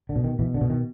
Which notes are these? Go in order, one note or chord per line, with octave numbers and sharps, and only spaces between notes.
D3
B2
D#3
B2 E3
D3
B2
D#3